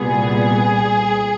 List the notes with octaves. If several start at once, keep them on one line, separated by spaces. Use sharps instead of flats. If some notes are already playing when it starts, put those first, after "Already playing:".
Already playing: C2 A#2 G3 B3 G#4